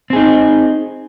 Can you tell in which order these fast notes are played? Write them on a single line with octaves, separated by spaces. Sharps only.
C4 G#4 D#4